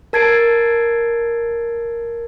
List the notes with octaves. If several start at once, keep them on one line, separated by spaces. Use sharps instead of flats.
A#4 A5 G#6 A6 C7 D7